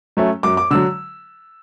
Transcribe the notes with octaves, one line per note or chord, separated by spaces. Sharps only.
F#3 A3 C#4
F#2 D6
D6
D3 F#3 E6